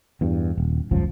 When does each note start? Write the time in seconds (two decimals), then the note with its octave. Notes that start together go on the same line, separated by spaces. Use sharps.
0.21 E2 G2
0.58 D#1
0.91 G#1 C#2 F#2 F3